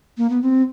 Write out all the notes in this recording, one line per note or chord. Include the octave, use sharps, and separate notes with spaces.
A#3
B3
C4